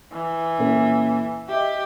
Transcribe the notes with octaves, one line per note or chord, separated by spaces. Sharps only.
E3
A#2 C#4 A4
G4 D#5 E5